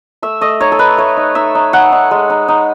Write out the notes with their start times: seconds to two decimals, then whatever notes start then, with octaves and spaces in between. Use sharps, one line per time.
0.22 A3 E5
0.41 A3 D#5
0.60 D#4 C#5
0.72 A4
0.79 D#4 B4
0.98 A3 C#5
1.17 D#4
1.35 D#4 E5
1.55 D#4
1.73 D#4 F#5
1.92 D#4
2.11 G#3
2.30 D#4
2.48 D#4